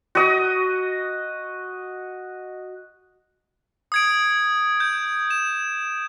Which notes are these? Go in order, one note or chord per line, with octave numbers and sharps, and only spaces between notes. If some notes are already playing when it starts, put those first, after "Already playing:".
F#4 D#5
D#6 G#6 D7
G6
E7